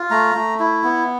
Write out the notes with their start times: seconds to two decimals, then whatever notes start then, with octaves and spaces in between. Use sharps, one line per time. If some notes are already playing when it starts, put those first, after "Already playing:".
Already playing: F4
0.11 A3 A#5
0.35 A3
0.60 E4
0.84 B3